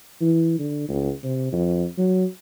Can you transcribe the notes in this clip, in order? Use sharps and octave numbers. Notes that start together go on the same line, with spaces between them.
E3
D3
C#2
C3
F2
F#3